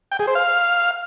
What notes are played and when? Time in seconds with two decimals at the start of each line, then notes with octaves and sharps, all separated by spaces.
0.12 G5
0.19 G#4
0.27 C5
0.35 F5